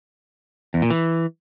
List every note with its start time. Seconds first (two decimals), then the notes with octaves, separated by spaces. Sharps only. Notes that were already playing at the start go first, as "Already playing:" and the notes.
0.74 E2
0.82 A#2
0.90 E3